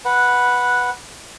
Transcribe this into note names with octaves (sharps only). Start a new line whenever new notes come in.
B4 F#5